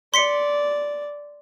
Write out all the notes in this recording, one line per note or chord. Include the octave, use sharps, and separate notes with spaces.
D5 C6 B6 C#7